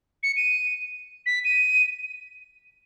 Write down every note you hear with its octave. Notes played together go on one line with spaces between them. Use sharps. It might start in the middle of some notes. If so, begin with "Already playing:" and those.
C#7
D#7
B6
D#7